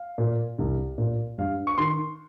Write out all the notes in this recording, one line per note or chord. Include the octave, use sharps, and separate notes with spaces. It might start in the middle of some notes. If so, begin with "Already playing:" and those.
Already playing: F5
A#2
C2
A#2
G2 F5
C#6
D#3 C6